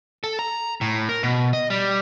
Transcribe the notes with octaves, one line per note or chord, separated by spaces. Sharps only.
A4
A#5
A2
A#4
B2
D#5
G3